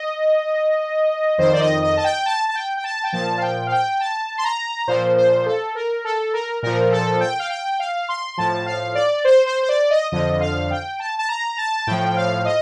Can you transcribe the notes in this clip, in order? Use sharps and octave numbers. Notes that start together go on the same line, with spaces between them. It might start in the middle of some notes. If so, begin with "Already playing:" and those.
Already playing: D#5
F2 D#3 C5
D5
D#5
D#5
A5
G5
A5
A5
G5
G5
A5
G5
A#2 F3 A5
F5
G5
F5
G5
A5
C6
A#5
A#2 F3 C5
C5
A4
A#4
A4
A#4
A#2 F3 A#4
A4
G5
F5
G5
F5
C6
A2 F3 A5
F5
D5
C5
C5
C5
D5
D#5
F2 D3 F3 D#5
F5
G5
A5
A5
A#5
A5
A2 F3 G5
F5
D#5